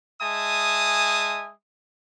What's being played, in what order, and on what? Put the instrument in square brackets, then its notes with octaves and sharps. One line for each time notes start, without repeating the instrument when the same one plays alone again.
[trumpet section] G#3 E5 G#5 A5 D#6